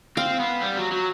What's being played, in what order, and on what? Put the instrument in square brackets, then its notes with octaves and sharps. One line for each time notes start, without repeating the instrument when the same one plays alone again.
[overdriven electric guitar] C4 [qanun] F5
[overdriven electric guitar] B3
G3
F#3
F#3